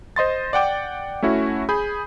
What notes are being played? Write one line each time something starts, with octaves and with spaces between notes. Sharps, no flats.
C5 D#5 C6 A6
D5 F#5 G5 D6
A3 C#4 E4 F#4 C#5
G#4 B5 G6